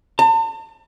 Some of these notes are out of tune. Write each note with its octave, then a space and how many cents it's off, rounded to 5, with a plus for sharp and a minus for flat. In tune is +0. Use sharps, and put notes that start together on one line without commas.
A5 +40